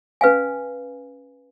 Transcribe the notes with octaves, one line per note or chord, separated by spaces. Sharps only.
C#4 B4 F5 G#5